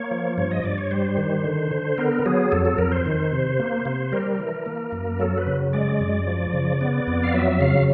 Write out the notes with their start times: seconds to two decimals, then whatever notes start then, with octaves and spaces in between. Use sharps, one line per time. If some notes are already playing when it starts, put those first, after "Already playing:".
Already playing: A#3 C#5
0.11 F3
0.38 G2 C#5
0.51 D#5
0.64 G2 D5
0.78 C#5
0.91 G3 C5
1.17 D#3
1.44 D3
1.71 D3
1.98 B3 A#4
2.26 F#3 G#4
2.52 F2 A4
2.65 A4
2.78 F2 A#4
2.92 C5
3.06 D#3
3.32 C3
3.59 A#3
3.85 C3
4.12 G3 A#4
4.39 E3
4.66 A#3
4.92 F#2
5.20 F#3 A4
5.38 B4
5.47 C#3
5.73 G#3 D5
6.00 F#2
6.27 F3
6.53 C#3
6.81 B3
7.07 F2
7.23 F5
7.34 F#3 E5
7.60 C#3 F5